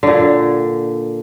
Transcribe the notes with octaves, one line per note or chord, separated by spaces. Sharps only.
A#2 D3